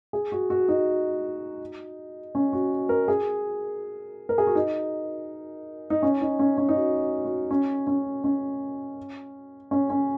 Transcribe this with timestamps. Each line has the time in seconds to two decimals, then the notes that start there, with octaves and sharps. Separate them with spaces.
0.13 G#4
0.32 F#4
0.50 F#4
0.68 D#4
2.35 C#4
2.53 F#4
2.89 A#4
3.08 G#4
4.29 A#4
4.38 G#4
4.47 F#4
4.55 D#4
5.90 D#4
6.02 C#4
6.21 D#4
6.39 C#4
6.58 C#4
6.69 D#4
6.76 F#4
7.25 F#4
7.51 C#4
7.87 C#4
8.24 C#4
9.71 C#4
9.90 C#4